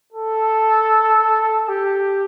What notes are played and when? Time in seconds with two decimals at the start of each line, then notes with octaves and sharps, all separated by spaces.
0.13 A4
1.69 G4